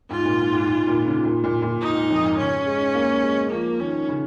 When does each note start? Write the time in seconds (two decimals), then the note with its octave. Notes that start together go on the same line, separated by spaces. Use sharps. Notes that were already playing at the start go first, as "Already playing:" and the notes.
0.10 G#2 F4
0.25 A#2
0.39 G#2
0.53 G#2
0.68 G#2
0.87 A#2
1.06 C#3
1.24 A#2
1.44 A#2
1.62 A#2
1.81 D#4
1.95 G#2
2.10 F2
2.24 G#2
2.38 C#3 C#4
2.66 G#3
2.95 A#3
3.23 G#3
3.51 F3 A#3
3.80 D#3 C#4
4.09 C#3